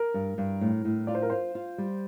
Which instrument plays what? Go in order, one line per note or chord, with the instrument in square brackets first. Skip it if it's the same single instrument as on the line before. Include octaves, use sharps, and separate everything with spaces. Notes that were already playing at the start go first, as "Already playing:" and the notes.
Already playing: [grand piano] A#4
[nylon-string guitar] G2
G2
A2
A2
[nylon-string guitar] F4 [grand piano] D5
[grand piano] C5
A#4
[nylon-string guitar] F4 [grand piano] C5
[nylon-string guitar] F4
G3